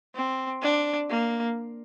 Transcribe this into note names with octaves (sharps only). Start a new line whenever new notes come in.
C4
D4
A#3